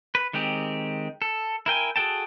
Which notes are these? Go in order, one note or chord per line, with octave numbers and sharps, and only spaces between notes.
B4
D#3 G#3 C4 G4
A4
E4 A#4 G5 G#5
F#4 G#4 A4 G5 A5